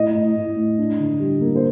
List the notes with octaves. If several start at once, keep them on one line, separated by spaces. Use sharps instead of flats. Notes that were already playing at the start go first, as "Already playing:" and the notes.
Already playing: A2 D#5
A2
A2
A2
D4
D3
G3
A#3
C5